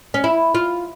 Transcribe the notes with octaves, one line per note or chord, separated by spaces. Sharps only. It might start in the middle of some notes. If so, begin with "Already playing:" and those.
C#4
E4
F4